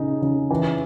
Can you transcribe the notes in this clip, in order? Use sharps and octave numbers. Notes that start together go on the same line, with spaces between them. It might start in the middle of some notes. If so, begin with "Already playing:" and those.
Already playing: C#3 D#4
C#3
E3